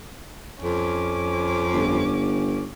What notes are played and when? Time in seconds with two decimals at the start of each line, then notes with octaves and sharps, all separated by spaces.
0.62 F2 C#4 D6
1.74 G1